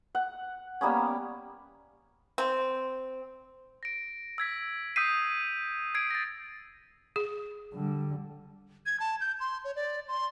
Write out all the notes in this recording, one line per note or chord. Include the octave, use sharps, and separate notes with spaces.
F#5
G3 A#3 B3 C#4
C4
A#6 D7
E6 G#6 B6
D#6 E6 G6 B6 C7 D#7
E6 G#6 C7 D7
A6 A#6
G#4
D3 G3
G#6
A5
G6
C6
C#5
D5
C6